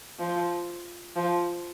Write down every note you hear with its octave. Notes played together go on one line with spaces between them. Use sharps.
F3
F3